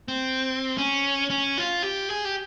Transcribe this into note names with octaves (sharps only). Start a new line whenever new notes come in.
C4
C#4
C#4
F4
G4
G#4
G4